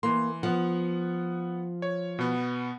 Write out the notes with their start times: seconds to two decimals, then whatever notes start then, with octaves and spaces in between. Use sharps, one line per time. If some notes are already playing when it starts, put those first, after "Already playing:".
0.03 E3 A#3 C6
0.43 F3 B3 F#5
1.82 C#5
2.19 B2 B3